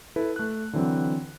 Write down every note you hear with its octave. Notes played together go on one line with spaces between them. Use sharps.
E4 A4 B4
A3 F#6
D3 E3 F#3 C4